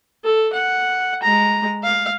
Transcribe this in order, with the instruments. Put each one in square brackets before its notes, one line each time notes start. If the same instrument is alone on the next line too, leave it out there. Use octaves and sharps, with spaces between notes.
[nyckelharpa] A4
F#5
G#3 A#5
F5